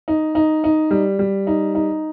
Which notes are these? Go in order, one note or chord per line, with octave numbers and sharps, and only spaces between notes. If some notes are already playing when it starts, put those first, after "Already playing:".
D#4
D#4
D#4
G3
G3
D#4
D#4